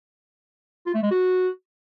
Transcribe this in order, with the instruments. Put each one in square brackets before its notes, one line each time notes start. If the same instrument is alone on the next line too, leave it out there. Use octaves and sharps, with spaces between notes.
[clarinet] F4
A3
G#3
F#4